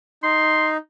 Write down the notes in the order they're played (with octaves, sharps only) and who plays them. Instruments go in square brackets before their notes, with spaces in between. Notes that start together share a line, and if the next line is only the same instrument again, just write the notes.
[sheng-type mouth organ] D#4 [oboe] C6